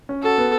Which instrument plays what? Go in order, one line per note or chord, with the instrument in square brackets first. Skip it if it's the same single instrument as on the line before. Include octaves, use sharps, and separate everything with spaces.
[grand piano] C#4
[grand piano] F#4 [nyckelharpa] A4
[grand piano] B3